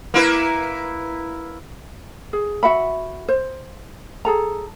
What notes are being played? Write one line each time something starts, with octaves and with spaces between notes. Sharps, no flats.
A#3 E4 B4
G#4
F#4 E5 F#5 B5
C5
G#4 A4 A#5